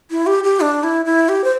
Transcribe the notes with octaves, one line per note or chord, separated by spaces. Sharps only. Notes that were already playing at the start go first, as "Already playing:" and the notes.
E4
G4
G4
D4
E4
E4
G4
C5